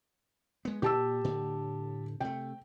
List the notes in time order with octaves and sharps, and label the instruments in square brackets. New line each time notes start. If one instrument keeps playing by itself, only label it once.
[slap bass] G#3 B3
[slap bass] A#2 [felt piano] G4 A5 E6
[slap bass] A2 D3
[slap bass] C3 A3 [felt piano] G5